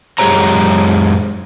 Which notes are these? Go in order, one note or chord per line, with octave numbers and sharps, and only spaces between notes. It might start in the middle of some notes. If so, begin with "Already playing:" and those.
F#2 G#3 G4 C5 C#5 A#5